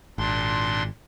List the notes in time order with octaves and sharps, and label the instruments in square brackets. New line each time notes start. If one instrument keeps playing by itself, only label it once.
[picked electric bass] G#1 [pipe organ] A#2 D4 C6